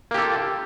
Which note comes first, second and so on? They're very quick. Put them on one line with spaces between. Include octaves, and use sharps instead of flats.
A#3 G4 A4 F4